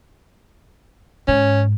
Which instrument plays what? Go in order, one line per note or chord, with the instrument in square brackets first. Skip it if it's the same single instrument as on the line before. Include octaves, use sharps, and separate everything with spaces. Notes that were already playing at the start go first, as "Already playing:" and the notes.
[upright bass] G#2 [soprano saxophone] C#4